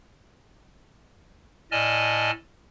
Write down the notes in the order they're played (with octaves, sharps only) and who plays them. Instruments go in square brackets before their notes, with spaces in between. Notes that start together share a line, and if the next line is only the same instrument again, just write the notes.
[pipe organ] A2 D5 D#5 G#5 A5 F6